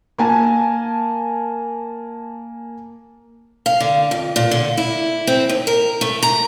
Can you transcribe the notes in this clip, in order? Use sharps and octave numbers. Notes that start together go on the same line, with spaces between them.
A#3 G#5 A5
F5
D3
F2
A#2
D3
E4
C4
D#2
A#4
A3
A#5